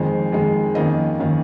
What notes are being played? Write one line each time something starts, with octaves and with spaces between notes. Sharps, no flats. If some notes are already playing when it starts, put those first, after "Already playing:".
Already playing: F2 D#3 G#3 C5
F2 D#3 G#3
F2 D#3 A#3 C#4 D#5
D#3 A#3 C#4